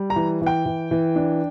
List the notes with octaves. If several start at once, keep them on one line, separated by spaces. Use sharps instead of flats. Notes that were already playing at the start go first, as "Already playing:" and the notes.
Already playing: G3
A#5
E3
E3
G5
E3
E3
D4